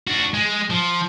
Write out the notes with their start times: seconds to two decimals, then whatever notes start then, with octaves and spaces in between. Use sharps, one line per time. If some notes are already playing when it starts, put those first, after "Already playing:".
0.07 D4 F#4
0.34 G#3
0.70 F3